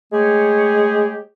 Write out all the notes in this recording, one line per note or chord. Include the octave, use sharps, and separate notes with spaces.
G#3 A3 G4 G#4 C#5